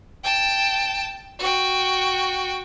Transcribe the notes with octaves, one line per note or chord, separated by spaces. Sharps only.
G5 A5
F#4 G5